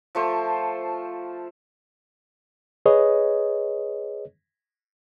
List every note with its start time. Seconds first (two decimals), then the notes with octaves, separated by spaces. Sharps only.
0.15 F3 A3 C5
2.86 G#4 B4 C#5 D#5